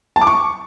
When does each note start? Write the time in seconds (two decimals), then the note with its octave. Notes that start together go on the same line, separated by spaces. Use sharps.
0.16 A5
0.21 D6
0.27 C#6